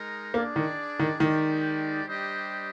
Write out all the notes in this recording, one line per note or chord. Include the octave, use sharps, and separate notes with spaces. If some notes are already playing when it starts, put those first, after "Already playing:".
Already playing: G#3 D#4 A#4
A#3 D4 G#4 D5
D#3
D#3
D#3 G#3 D#4 G4 D5
G3 D4 G4 C5 D#5